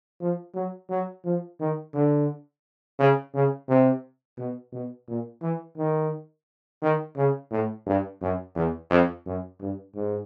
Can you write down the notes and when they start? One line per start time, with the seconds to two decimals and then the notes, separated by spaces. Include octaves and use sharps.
0.21 F3
0.54 F#3
0.90 F#3
1.24 F3
1.60 D#3
1.94 D3
2.99 C#3
3.34 C#3
3.68 C3
4.37 B2
4.72 B2
5.07 A#2
5.42 E3
5.77 D#3
6.82 D#3
7.16 C#3
7.51 A2
7.86 G2
8.21 F#2
8.55 E2
8.90 F2
9.26 F#2
9.60 G2
9.95 G#2